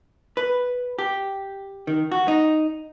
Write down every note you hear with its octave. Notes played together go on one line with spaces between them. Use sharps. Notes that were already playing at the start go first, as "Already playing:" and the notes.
B4
G4
D#3
F#4
D#4